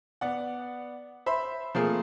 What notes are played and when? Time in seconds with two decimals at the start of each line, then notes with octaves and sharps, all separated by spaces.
0.21 B3 D5 F#5
1.26 C5 E5 B5
1.75 F3 A3 A#3 C4 G#4